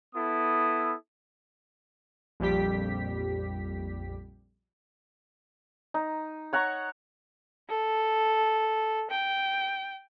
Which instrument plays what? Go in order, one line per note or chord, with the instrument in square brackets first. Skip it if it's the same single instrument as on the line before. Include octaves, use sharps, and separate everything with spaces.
[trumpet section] B3 E4 A4 D#6
[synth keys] A#1 F2 G3 G4 B6
[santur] D#4
C#5 F#5 A#5 C#6
[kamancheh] A4
G5